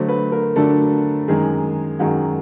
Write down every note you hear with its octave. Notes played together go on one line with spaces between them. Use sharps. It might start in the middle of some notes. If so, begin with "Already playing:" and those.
Already playing: D3 F#3 A3 D4 C5
B4
A#4
D3 F#3 A3 D4 A4
F#2 D#3 G#3 G#4
F#2 D#3 G#3 F#4